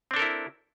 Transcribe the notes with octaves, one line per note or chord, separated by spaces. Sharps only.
C4 D4 E4 A4 A#4